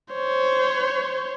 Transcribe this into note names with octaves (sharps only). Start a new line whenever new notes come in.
C5 C#5